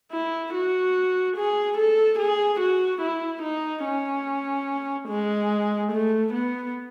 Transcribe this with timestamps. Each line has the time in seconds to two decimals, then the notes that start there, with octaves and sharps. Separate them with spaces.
0.12 E4
0.54 F#4
1.37 G#4
1.78 A4
2.19 G#4
2.61 F#4
3.02 E4
3.43 D#4
3.85 C#4
5.09 G#3
5.92 A3
6.34 B3